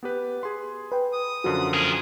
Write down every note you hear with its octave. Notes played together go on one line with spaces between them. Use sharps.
B3 G4 B4
G#4 C6
B4 G5
D#6
F#2 D3 F3 F#4
G#4 A#4